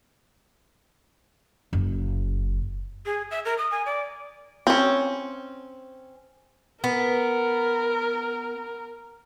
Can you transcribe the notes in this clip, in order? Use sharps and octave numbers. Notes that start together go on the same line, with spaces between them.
F#1
G#4
E5
A#4
D#6
G#5
D5
C4 C#4
B3 A#4